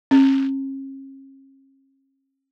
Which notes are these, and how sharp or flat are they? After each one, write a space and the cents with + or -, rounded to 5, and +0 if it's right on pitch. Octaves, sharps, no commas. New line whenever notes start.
C#4 -40